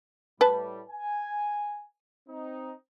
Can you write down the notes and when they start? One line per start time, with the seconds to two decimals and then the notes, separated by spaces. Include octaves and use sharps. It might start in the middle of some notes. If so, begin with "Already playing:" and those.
0.41 A2 G3 B4 A5
0.89 G#5
2.29 C4 D#4